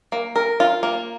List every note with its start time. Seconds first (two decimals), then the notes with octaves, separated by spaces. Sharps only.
0.12 A#3
0.36 A#4
0.60 F4
0.83 A#3